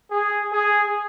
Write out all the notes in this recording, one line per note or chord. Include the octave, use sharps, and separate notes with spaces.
G#4
G#4